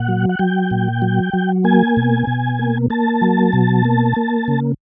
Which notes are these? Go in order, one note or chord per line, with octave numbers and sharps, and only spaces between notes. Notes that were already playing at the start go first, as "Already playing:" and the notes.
Already playing: A#2 F#5
F#3
F#5
F#3 G5
A#2
F#3
F#3
A#3 G#5
B2
B2
A#3
A#3 A5
F#3
B2
A#3
A#3
C#3